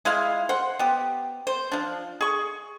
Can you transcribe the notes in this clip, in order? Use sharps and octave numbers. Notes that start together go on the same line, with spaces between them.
G#3 E4 F4 F5
C5 F#5
B3 G4
C5
F3 D4
G#4 C#6